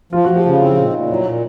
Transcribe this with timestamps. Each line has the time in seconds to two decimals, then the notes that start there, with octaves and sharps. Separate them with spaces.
0.13 F3 F4
0.24 F3 F#4
0.36 G4
0.45 C#3
0.61 C4 E4
0.76 A#2
0.85 D#4
0.93 A#2
1.10 F#3 E4
1.26 A#2